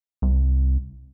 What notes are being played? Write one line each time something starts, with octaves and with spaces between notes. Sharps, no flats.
C2